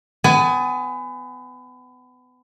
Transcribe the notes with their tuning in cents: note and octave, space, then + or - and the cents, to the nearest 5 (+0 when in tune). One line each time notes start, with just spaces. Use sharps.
B3 +30 G#5 +0